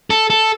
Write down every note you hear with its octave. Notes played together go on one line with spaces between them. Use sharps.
A4
A4